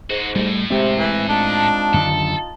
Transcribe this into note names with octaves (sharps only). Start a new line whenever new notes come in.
G#2 G#3 F#4
A2 G3 A3
C3 G#3 C4
E3
D4 D#4 F4 A5
F#2 D3 D#3 A4